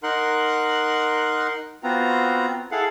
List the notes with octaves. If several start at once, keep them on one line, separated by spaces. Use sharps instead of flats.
D#4 A#4 F#5 C6 F#6
B3 C4 F4 F#4 A#5
E4 G#4 A4 F5 F#5